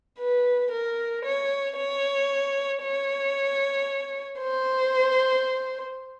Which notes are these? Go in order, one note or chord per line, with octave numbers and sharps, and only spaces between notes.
B4
A#4
C#5
C#5
C#5
C5